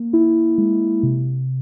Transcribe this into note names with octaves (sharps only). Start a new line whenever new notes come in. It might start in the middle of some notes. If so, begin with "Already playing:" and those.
Already playing: A#3
E4
G#3
C3